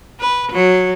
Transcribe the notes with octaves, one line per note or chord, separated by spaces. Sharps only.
B4
F#3